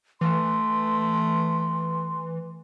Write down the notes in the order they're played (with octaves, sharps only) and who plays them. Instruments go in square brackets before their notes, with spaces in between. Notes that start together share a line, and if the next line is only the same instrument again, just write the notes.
[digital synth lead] E3 [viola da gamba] A3 [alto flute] C6